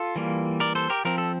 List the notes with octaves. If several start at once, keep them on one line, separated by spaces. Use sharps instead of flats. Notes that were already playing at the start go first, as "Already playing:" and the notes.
Already playing: F4 A4
E3 G3 A#3
A#4 D5
A4 C5
G4 A#4
F3 C4 A#4
A4